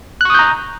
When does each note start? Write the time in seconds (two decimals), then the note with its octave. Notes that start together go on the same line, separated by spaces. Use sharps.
0.21 F#6
0.25 C#6
0.30 D#6
0.34 G6
0.39 A#5